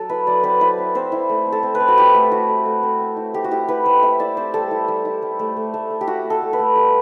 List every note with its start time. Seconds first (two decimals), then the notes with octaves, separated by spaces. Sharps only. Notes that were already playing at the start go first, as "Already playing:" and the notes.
Already playing: F#3 A4
0.09 E4 B4
0.27 F#3 D5
0.44 C4 B4
0.61 E4 B4
0.78 C4
0.95 C4 C5
1.12 E4
1.29 A3
1.46 C4
1.52 A4
1.63 C4
1.75 B4
1.80 C4
1.88 F#4
1.97 E4 G4
2.15 A3
2.31 E4 F#4
2.49 A3
2.66 A3
2.83 C4
3.00 C4
3.17 E4
3.34 A3 G4
3.44 F#4
3.51 E4 G4
3.68 E4 B4
3.86 A3 C5
4.02 C4 E5
4.20 E4 D5
4.37 C4 C5
4.54 G3 A4
4.71 E4
4.88 G3
5.05 E4
5.22 G3
5.39 A3
5.57 A3
5.74 A3
5.90 A3
6.01 G4
6.07 E4 F#4
6.24 A3
6.30 A4
6.42 A3
6.53 B4
6.59 A3
6.76 G3